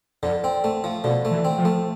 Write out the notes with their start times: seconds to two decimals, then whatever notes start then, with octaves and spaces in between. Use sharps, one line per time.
0.23 F2 D3
0.44 C4
0.64 A3
0.84 F3
1.04 B2 D3
1.25 A3
1.31 E3
1.45 C4
1.58 F3
1.65 A3